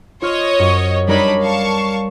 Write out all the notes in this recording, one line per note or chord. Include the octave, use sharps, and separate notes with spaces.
F4 C5 C#5 D#5 F6
F#2
G3 D4 D#4 A#4 C#5 B5
F5 A5 C#6